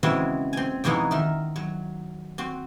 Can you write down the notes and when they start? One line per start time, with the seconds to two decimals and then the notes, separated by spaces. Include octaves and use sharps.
0.03 C#3 E3 G#3 C4 F#4 E5
0.53 C4 G#5
0.84 F2 B2 E3 G#3 D#4 F#5
1.11 D#3 A#4 E5
1.56 F#3
2.38 C4 F#4